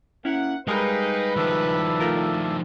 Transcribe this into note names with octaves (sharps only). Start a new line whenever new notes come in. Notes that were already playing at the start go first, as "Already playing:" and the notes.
A#3 C#4 E4 F#5
G3 G#3 D#4 G#4 A#4 B4 F5 G5
D#3 F3 A4 D5 E5
A3 F4 A#4